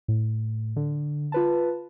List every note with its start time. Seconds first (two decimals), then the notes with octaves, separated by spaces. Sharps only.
0.08 A2
0.76 D3
1.32 F4 B4 A5